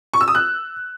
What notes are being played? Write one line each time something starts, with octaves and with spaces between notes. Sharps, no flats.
C#6
E6
D#6
F#6